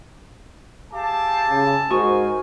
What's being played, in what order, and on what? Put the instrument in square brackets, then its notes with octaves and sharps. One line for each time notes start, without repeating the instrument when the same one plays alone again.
[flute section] G4 F5 D6 [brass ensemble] G#4 E5 A5
[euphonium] C#3
[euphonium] G#2 [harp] F#4 C#6 D#6 [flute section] A#4 C5 G#5